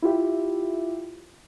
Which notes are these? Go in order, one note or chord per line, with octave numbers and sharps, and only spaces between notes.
E4 F4 G4 E5